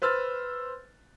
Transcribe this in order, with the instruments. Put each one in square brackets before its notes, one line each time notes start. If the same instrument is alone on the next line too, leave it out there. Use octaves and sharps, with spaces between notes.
[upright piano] B4 C5 E6 F6 A6